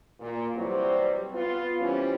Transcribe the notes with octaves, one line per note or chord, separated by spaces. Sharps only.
A#2
C3 E3 F#3 G3 C4
B3 F4
E3 G3 C4 C#4